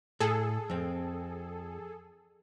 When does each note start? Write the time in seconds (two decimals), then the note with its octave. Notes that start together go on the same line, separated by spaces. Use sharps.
0.20 A2 G#4 A4
0.70 F2 C4